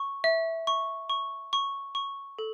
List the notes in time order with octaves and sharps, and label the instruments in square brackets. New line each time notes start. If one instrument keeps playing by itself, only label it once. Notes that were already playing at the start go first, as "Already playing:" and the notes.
Already playing: [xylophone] C#6
E5
C#6
C#6
C#6
C#6
A4